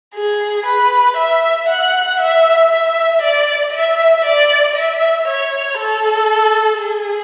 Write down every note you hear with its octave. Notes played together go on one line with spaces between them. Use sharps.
G#4
B4
E5
F#5
E5
E5
D5
E5
D5
E5
C#5
A4
G#4